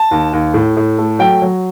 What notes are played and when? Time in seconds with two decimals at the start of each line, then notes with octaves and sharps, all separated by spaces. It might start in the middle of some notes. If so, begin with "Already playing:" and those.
Already playing: A5
0.11 D#2
0.33 D#2
0.54 A2
0.77 A2
0.98 A3
1.19 F#3 G5
1.42 F#3